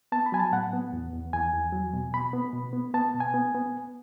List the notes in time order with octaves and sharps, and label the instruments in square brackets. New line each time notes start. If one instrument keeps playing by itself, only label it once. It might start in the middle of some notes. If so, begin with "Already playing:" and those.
[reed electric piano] B3 A5
B5
F#3 G#5
A5
A2 F#5
B3
E2
E2
E2 G#5
E2
F#3
B2
B2 B5
B3
B2
B3
B3 A5
B2
G#5
B3
B3